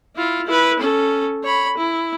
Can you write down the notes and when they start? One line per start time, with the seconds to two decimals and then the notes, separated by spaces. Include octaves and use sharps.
0.16 E4 F4
0.46 E4 B4
0.79 C#4 A4
1.44 C#5 B5
1.78 E4